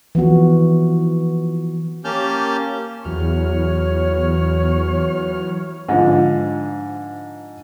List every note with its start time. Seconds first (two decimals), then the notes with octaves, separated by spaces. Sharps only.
0.15 E3 F3 B3 F#4
2.05 A#3 C#4 G4 A5 F6 G6
3.05 E2 E3 F#3 C#5 F6
5.89 G#2 D3 F3